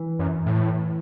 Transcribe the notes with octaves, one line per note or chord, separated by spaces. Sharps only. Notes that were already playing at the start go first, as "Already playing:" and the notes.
Already playing: E3
F#2
A2